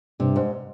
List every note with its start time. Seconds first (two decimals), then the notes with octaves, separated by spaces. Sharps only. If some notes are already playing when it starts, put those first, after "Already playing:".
0.20 G2 C3
0.36 G#2